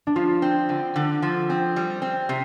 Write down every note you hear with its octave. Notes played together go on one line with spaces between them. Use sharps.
D4
F3 F4
C4
D3
D3
F3
C4
G3
C4
C3